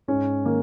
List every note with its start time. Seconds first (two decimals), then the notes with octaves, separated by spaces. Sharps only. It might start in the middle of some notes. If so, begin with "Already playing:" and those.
0.08 G#2 C#4
0.45 D#3 A#3